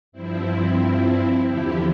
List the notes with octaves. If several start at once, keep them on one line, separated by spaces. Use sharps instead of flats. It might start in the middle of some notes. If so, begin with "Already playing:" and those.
G2 F3 C4 E4
E2 D3 F3 E4 G4